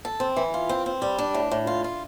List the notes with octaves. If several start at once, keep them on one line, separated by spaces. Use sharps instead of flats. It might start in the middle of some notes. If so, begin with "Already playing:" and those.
A4
C4
E3
F4
C4
C4
G3
D4
A2
A2
F4
F4